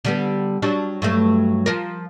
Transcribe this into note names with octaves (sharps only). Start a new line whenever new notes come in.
D3 G3 B3
F#3 G3 D4
G2 F#3 A3
F3 A#4